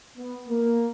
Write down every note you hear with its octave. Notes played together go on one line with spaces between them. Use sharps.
B3
A#3